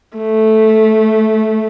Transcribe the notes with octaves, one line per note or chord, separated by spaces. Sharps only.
A3